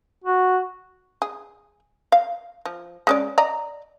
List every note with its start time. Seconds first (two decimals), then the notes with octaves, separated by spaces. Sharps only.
0.24 F#4
1.22 G#4
2.12 F5
2.66 F3
3.07 G#3 C#4 D5
3.38 D5 D#5 A#5